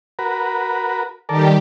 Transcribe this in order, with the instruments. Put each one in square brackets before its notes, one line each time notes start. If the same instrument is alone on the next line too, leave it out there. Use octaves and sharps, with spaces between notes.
[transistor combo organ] F#4 A#4 B4
[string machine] D#3 G3 G4 [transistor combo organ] A4 A#4 D5